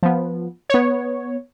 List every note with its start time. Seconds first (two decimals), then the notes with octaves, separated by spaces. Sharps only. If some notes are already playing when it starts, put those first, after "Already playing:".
0.03 F3 B3
0.70 B3 C#5